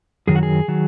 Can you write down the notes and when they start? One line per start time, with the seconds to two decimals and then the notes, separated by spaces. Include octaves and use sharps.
0.27 F#2 D#3 F#3 G#4
0.35 F#4
0.43 G#4
0.68 D#3 F#3